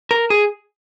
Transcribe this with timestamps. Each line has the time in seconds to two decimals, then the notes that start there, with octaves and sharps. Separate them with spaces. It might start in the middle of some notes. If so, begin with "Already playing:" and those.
0.11 A#4
0.30 G#4